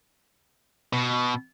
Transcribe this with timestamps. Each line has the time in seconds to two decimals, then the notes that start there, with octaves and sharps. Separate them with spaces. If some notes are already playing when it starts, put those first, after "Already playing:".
0.93 B2